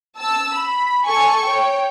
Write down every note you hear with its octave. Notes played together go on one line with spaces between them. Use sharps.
A5 E6
B5
A4 G#5 C#6
C#5 G5